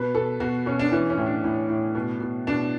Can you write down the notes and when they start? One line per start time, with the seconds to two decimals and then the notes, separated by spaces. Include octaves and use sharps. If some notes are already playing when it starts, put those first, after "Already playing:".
Already playing: B2 B4
0.15 B2 A4
0.40 B2 F#4
0.66 B2 C#4
0.79 D4
0.92 E3 C#4
1.10 C#4
1.17 A2
1.26 D4
1.44 A2
1.69 A2
1.95 B2
2.20 B2
2.47 B2 D4